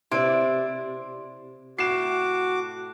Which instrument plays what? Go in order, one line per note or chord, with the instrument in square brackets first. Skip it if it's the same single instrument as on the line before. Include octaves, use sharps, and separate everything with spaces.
[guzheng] C3 [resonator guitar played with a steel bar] E4 D5 [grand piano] C6 D7
[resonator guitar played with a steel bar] A2 [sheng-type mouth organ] F#4 D6 [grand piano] C7 E7